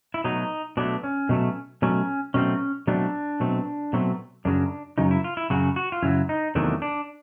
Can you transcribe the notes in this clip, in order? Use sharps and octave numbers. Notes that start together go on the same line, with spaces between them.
E4
B2 F#3 A3 D#4
B2 F#3 A3 D4
C#4
B2 F#3 A3
B2 F#3 A3 C#4
B2 F#3 A3 C4 C#4
B2 F#3 A3 C4 D4
B2 F#3 A3 C4
B2 F#3 A3 C4
F#2 C#3 F#3 D4
F#2 C#3 F#3 D#4
E4
F4
E4
F#2 C#3 F#3 F#4
F#4
F4
F#2 C#3 F#3 E4
D#4
E2 C3 D#3 F#3 A3 D4
D4